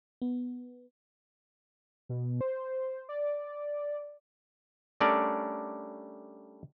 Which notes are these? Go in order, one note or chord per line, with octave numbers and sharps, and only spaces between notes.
B3
B2
C5
D5
G3 A3 C#4 D4 A#4 D5